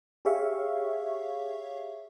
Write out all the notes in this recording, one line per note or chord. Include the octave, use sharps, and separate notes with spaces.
G4 G#4 C#5 E5 F5 C#6